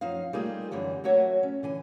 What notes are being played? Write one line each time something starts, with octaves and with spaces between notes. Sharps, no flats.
F#2 F3 D#4 F5
G3 A3 A#3 D#4 F4 G#4
F#2 D3 E3 G3 A#5
F#3 A3 A#3 F#4 C#5 E5
C#4
D3 E3 G#5